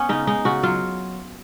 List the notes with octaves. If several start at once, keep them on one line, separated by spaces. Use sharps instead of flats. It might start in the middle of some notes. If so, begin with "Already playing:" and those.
Already playing: B3 C#4
C#3 D#4
G#3 D#4
C#3 F#4
F#3 F4